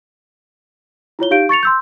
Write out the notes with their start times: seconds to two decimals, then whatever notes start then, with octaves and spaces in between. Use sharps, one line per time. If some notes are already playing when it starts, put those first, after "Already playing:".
1.19 E4 F4 C#5 G7
1.31 D#4 G4 F5 G6 D7
1.49 C#6 A6 C#7 F7
1.63 C6 E6 G6